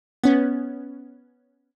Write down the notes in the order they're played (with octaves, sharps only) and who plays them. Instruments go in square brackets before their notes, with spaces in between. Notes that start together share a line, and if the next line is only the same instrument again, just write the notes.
[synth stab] B3 C#4